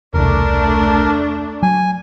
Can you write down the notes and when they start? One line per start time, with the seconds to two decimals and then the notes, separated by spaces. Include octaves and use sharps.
0.14 E1 C2 A3 D4 A#4
1.63 F#3 G#5